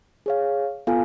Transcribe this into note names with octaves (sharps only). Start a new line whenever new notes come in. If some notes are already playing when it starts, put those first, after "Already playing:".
G#4 C#5 F5
B3 F4 A4 F5 G#5